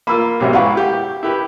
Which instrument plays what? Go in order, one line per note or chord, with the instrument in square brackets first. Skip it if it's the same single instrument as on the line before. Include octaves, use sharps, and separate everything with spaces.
[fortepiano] A#3 F4 [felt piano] B5 E6
[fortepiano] B1 G#2 B2 [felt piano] G4 C#5 E5
[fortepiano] E4 B4 [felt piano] F5 F#5 C#6
[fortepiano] G4 [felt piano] G6
[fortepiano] E4 G4 B4